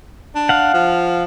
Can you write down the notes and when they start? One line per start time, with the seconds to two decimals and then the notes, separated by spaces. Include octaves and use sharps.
0.35 D4
0.49 F5 F#5
0.74 F3